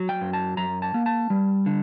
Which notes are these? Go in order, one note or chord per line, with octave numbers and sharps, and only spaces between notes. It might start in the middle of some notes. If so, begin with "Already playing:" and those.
Already playing: F#3
G5
F#2
A5
F#2 A#5
A5
A#3
A5
G3
D3